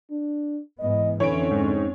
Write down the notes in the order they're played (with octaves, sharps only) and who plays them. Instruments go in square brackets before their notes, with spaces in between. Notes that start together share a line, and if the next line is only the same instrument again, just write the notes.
[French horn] D4
[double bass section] G#2 E3 B3 [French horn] D#5
[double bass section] F2 C4 C#4 [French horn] D3 [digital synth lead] E3 [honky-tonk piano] C#5 D7
[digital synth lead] G#2